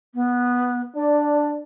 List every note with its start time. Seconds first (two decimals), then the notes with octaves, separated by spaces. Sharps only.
0.15 B3
0.96 D4 D5